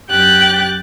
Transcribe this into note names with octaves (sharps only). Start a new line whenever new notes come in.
F#2 G4 G5 F#6 A6